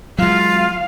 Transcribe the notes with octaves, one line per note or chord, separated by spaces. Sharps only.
F#3 G#3 F4 F5